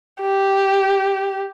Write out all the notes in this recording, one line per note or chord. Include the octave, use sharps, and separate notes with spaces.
G4